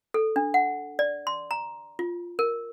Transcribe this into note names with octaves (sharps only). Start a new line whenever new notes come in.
A4
D4
F#5
D5
C6
A#5
F4
A#4